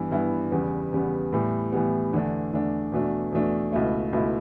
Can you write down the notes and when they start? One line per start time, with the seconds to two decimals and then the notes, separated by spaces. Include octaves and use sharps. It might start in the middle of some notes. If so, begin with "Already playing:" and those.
Already playing: G2 E3 B3 E4
0.11 G2 E3 B3 E4
0.52 E2 C#3 G3 B3
0.92 E2 C#3 G3 B3
1.33 A2 E3 G3 B3
1.72 A2 E3 G3 B3
2.13 E2 D3 A3 D4
2.53 E2 D3 A3 D4
2.92 E2 B2 A3 D4
3.32 E2 B2 A3 D4
3.72 C#2 B2 A3 E4
4.13 C#2 B2 A3 E4